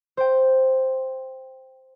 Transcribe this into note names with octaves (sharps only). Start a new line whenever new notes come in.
C5 G5